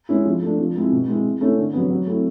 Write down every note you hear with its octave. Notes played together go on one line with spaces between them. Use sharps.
G#3 C#4 E4
F3
A3 D4
F3
G#3 C4 E4
B2
G#3 C4 E4
E3
A3 C#4 E4
D3
F#3 B3
F#3
A3 C4 E4